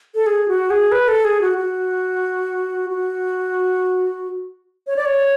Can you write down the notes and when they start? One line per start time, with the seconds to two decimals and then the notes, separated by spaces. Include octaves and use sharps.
0.15 A4
0.26 G#4
0.48 F#4
0.70 G#4
0.92 B4
1.08 A4
1.25 G#4
1.41 F#4
1.57 F#4
2.90 F#4
4.87 C#5
4.96 D5
5.05 C#5